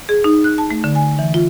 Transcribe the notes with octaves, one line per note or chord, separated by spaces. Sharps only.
G#4
D#4
F#6
A5
A3
D3
G#5
E3
F4